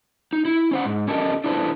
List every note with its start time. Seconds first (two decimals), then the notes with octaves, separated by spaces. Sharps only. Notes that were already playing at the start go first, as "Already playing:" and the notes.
0.33 D#4
0.45 E4
0.71 C#4 C5 F#5
0.85 G#2
1.08 C#4 G4 A4 A#4 C#5 D#5
1.44 D4 E4 A4 B4 C5